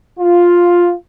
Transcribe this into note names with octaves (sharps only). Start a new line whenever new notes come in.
F4